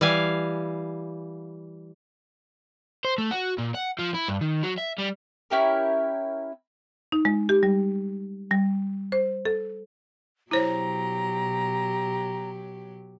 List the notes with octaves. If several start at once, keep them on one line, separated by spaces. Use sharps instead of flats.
E3 G3 F5 G#5
C5
A3
F#4
A#2
F#5
F3
E4
G2
D#3
F#3
E5
G3
C#4 E4 G4 A#4
D#4
G#3
G4
G3
G3
C5
A4
B2 F#3 E4 G4 C5 C#5 A#5